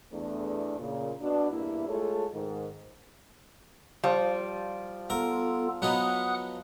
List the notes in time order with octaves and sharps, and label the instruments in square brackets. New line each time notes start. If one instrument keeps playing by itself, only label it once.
[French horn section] E2 A3 D4
A#2 C#3
B2 D4
E2 G2 A#3 E4
G#3 A3 F4 G#4 A4 C#5
G#2 D#3
[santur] F3 F4 [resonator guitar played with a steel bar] G3
[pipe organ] B3 F4 A4 [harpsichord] A#4 [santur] F5
[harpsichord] F#3 B3 D#4 [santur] B4 [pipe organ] F#5 D#6 F#6